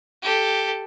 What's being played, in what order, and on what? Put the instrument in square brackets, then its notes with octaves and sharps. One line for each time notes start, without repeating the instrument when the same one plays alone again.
[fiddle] G4 A4